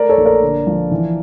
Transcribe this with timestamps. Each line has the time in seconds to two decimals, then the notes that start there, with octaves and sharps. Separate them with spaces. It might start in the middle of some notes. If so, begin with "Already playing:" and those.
Already playing: A3 A#4 D5
0.09 A4 C#5
0.17 A#1
0.25 A#4 D5
0.42 D3
0.67 F3
0.91 E3